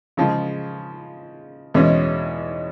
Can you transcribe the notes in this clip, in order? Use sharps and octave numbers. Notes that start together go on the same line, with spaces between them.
C#3 F3 G#3
E2 B2 G#3 C#4